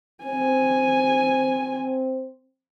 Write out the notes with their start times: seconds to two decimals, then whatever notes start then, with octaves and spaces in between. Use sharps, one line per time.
0.24 C4 G#5